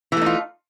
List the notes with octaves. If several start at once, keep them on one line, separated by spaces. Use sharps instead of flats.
E3 A3 D#4 F4